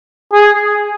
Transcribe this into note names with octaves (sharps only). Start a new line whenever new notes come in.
G#4